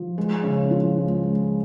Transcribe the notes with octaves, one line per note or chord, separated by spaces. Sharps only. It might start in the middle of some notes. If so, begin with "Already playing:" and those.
Already playing: F3
G#3
C#3
F3
C#2
G#3